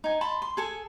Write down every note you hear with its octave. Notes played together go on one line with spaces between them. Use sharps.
D#4 G#5
A5 B5 C6
C6
G#4 A4 G#5